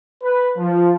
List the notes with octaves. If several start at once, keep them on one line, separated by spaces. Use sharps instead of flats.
B4
F3